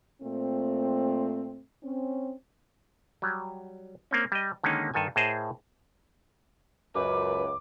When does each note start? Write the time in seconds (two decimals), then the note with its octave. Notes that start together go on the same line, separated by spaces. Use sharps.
0.22 A#2 A3 C4
1.83 C4 C#4
3.22 F#3 G3
4.11 A#3 C4 C#4
4.32 G3 D#5
4.64 D3 D#3 G#3 A#3 C#4 D#4
4.94 G2 D#3 A4 G#5
5.16 A2 G#4 A#4 C5 D#5 A5
6.95 C#2 F#2 B4 D6